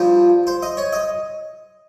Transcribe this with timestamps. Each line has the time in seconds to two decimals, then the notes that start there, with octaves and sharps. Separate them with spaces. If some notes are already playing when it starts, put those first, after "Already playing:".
Already playing: G2 F3 C5
0.47 C5
0.63 D#5
0.77 C#5
0.93 D#5